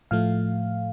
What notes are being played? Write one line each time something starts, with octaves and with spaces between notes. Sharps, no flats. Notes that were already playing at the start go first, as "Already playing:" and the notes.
A2 F3 A3 F5